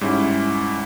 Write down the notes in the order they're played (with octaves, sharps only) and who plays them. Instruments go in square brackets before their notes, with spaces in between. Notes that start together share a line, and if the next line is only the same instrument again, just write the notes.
[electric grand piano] G#2 G3 C#4 E4